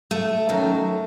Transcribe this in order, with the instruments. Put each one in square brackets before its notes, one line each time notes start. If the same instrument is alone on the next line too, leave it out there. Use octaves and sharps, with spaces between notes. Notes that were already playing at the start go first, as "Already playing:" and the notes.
[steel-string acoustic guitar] A3
F#2 D#3 F#3